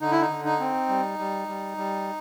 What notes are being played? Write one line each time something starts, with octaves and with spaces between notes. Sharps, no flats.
D3 D#4
E4
D#4
D3
D#4
C4
G3
G3
G3
G3